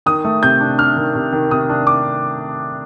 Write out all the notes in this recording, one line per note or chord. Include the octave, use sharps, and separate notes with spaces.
D#3 D#6
A3
C3 G6
D4
D4 F6
D#3
C3
D#3
C3 D#6
D4
D6